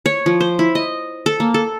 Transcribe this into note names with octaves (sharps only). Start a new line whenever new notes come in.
C#5
F3
C5
E4
D#5
A4
A#3
A4